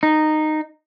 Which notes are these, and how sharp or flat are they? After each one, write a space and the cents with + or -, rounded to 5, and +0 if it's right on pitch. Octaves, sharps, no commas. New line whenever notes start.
D#4 -10